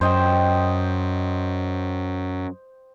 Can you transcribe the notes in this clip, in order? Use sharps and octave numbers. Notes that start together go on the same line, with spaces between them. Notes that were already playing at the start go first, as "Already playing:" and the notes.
F#2 C5 D#5 G5